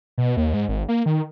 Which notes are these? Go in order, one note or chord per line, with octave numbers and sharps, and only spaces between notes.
B2
D#2
G#2
G#1
A#3
D#3